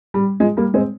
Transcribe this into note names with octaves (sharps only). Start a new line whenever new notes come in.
G3
F3 G#3
G3 A#3
G#3 C4